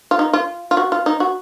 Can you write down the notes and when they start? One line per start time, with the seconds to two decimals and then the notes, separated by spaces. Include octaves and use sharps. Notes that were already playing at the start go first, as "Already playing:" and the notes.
0.11 F4
0.19 D#4
0.33 F4
0.71 F4
0.77 F#4
0.92 F4
1.06 D#4
1.20 F#4